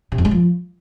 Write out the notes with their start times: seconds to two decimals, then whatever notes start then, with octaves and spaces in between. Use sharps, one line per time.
0.12 C3
0.18 F2
0.25 G#3
0.31 F3